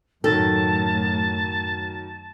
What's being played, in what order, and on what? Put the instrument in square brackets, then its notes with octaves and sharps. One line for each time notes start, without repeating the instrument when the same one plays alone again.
[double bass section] F#2 A2 [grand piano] D#3 F#3 [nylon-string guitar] A4 [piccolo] A5